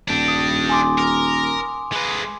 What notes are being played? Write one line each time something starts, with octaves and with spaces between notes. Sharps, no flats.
D#1 D4 G4
D#6
G#5 C6 D6
A#4
G#3 B4